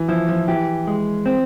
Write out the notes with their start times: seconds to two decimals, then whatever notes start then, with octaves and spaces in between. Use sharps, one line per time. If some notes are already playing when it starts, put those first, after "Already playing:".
Already playing: E3
0.08 F3 E4
0.29 F3
0.48 E3 G4
0.87 G#3
1.26 C4